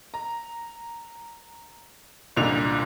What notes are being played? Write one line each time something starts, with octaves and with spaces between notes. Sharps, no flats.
A#5
F#1 C2 A#2 D3 F7